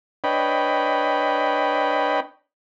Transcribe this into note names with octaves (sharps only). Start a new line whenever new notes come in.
D4 B4 C#5 D#5 G5 B5